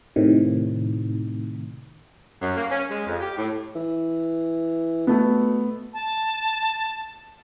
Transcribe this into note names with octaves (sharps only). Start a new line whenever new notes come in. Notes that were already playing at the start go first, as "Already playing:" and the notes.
A2 C3 D#3
F#2
A#3
C#4
G#3
F2
G4
A2
E3
B2 A3 B3
A5